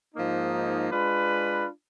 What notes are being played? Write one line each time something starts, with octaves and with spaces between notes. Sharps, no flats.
G#2 F3 A#3 D#4
G#3 D4 F4 B4